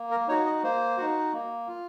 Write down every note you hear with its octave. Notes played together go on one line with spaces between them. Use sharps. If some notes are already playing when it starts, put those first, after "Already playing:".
Already playing: A#3
A#4
D#4 F#4 C#5
D#5
A#3 C5
D#4 F#4
A#3
F4